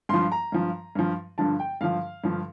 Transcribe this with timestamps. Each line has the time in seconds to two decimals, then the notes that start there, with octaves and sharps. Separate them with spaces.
0.09 G2 F3 C6
0.32 A#5
0.52 G2 F3
0.95 G2 F3
1.38 G2 D3 F3 A5
1.60 G5
1.81 G2 D3 F3 F5
2.24 G2 D3 F3